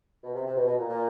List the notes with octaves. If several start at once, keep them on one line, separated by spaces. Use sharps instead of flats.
B2
C3
C3
B2
B2
A#2
A#2